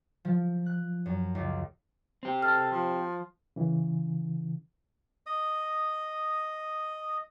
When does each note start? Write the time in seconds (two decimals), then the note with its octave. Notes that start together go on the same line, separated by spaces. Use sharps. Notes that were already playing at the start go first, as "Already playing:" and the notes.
0.25 F3
0.66 F#6
1.06 F#2
1.35 C#2
2.23 C4 G4
2.42 A4 F6
2.71 F3
3.56 C#3 E3
5.26 D#5 D#6